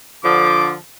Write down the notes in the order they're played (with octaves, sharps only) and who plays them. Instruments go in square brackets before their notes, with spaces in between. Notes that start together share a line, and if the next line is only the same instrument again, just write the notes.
[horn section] D3 F3 [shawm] D6